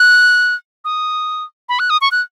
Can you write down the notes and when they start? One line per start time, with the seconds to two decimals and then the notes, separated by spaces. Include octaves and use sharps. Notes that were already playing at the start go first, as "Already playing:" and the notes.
Already playing: F#6
0.85 D#6
1.69 B5
1.79 F#6
1.90 D#6
2.01 C#6
2.12 F#6